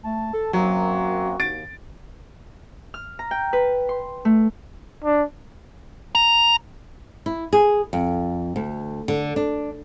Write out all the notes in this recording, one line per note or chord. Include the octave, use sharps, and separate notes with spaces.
A3 A5
A4
F#2 F#3 A#3 C4 F#4
D#2 A6 D7
F6
A#5
G5
B4
C6
A3
D4
A#5
E4
G#4
F2
D2
D3
D4